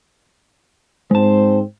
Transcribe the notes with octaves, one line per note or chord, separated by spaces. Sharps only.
G#2 G#3 C4 C5 A5